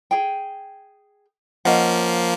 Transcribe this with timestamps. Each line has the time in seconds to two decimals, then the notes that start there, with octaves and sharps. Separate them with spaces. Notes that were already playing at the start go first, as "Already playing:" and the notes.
0.11 G#4 G5
1.65 F3 A#3 C#4 D#5 F#5